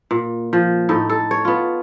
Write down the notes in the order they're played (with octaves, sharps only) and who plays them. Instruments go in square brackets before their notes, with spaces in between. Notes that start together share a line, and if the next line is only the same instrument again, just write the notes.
[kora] A#2
F3
A2 D#4 A4
A4
C#5
B3 F4